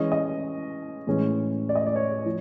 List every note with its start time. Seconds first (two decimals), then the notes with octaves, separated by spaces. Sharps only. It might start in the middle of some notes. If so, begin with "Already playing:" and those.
Already playing: E3 G#3 C#4 D#5
0.12 D#5
1.07 A2 E3 G#3 C#4
1.69 D5
1.75 D#5
1.86 D5
1.96 C#5
2.26 F3